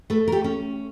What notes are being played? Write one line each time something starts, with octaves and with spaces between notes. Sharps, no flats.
A3 A4 B4
A#4
G4 A4
C#4